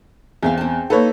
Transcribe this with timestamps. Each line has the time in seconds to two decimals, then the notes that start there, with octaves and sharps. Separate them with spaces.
0.43 E2 C4 E5 F5
0.57 C4 A5
0.90 A#3 D#4 A4 B4 C#5